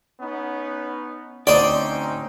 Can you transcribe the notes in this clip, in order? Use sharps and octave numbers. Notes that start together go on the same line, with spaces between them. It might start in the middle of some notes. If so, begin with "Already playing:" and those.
B3 C#4 D#4
D2 C4 C#4 D#4 C5 D5 D#5 G5